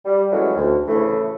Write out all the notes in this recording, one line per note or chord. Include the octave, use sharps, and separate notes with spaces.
G3
A2 E3 F#3 G#3 A3 C#4
D2
A2 C#3 E3 A3